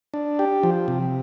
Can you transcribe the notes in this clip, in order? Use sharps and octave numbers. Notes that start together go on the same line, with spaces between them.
D4
G4
F3
C3